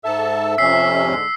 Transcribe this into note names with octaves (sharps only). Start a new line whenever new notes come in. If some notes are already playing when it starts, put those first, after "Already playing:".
G#2 A4 E5 A5
F2 C3 C#4 E6 B6 C7
G#2 D3 G#3